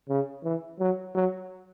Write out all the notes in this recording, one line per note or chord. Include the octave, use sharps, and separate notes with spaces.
C#3
E3
F#3
F#3